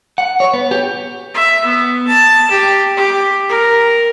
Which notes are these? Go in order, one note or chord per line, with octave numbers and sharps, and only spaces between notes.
F#5
C#5
B3
G4
E5
B3
A5
G4
G4
A#4